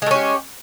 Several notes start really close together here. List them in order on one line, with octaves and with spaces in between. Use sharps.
G#3 A3 C#4 G4